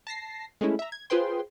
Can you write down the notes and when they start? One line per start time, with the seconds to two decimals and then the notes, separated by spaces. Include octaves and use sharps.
0.07 A5 A#6 C7
0.61 G#3 A3 C#4 E4
0.79 E5 A#5
0.92 G#6
1.10 F4 G#4 B4 C5 G5 C6